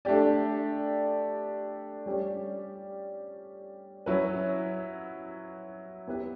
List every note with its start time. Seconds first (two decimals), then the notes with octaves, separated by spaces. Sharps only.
0.05 A3 D4 G4 D5
2.06 G3 C#4 G4 D5
4.06 F#3 C#4 E4 B4
6.07 B3 E4 G4 B4